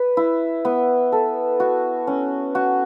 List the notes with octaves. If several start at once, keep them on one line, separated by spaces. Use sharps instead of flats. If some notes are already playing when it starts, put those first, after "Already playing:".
Already playing: B4
E4
B3
A4
F#4
C#4
F#4